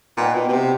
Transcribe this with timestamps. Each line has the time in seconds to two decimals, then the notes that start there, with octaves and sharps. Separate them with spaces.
0.17 A#2 D#3 G3 B3
0.35 B2
0.48 B2
0.53 C3